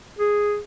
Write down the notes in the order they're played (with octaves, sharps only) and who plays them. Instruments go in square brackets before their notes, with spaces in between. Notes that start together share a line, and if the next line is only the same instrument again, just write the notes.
[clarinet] G#4